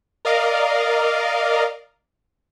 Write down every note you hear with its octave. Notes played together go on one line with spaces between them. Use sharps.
A#4 D5 D#5 F5